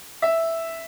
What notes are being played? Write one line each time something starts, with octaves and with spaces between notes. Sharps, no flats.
E5